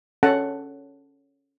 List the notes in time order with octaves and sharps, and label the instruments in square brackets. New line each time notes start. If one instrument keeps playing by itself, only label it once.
[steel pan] C#4 A4 F#5 A5